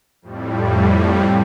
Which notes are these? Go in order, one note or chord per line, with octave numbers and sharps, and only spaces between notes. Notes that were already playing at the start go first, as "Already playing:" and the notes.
F2 A2 G3